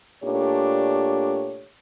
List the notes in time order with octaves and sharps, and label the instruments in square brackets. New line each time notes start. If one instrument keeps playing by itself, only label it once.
[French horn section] A#2 A3 D4 G4 C#5